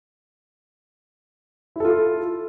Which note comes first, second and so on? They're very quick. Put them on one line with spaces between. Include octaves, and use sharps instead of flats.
E4 A4 F4